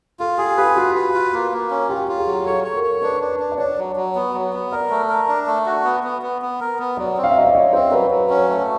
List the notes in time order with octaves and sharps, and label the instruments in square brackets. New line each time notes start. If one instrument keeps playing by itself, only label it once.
[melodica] F4 [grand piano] A4
[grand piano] G4 [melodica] G#4
[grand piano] G4 [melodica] B4
[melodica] F4 [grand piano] F#4
[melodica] B4
F4
A#3
A#3
C#4
[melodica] F4 [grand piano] G4
[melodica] F4
[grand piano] G#4
[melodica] F#3
[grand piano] A4 [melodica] C#5
[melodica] C#5
[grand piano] A#4
[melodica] C#5
[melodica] D4 [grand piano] B4
[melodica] D4
D4
[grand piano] D5
[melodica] D4 [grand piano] C#5
[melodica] F#3
F#3
B3
F#3
B3
[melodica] A#4 [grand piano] D5
[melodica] A3
A#4
D4
A3
F#4
B3
B3
B3
B3
A#4
B3
[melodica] F#3 [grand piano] D5
[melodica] C4
[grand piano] F5
E5
[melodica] F#3 [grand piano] D#5
[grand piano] D5
[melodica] F#3 [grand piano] C#5
[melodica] C4 [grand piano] C5
[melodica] F#3 [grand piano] B4
[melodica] F#3
C#4
A3